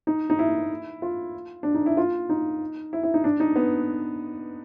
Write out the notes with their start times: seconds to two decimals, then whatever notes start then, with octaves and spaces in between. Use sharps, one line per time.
0.07 D#4
0.30 D#4
0.39 E4
1.02 F4
1.63 D4
1.75 D#4
1.86 E4
1.97 F4
2.29 D#4
2.93 E4
3.03 E4
3.14 D#4
3.24 D4
3.40 D#4
3.56 B3